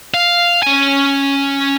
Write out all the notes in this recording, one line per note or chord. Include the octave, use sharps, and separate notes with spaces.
F5
C#4 G#5